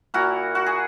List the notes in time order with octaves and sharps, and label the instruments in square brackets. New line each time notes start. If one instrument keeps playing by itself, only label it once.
[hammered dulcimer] A#2 A#3 E4 F#4 A#4
F#4
G#4